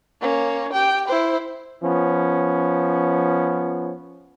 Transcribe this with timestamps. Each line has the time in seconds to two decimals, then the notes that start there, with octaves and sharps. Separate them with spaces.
0.22 A#3 C#4
0.73 G4 G5
1.08 E4 C5
1.82 F3 B3 C#4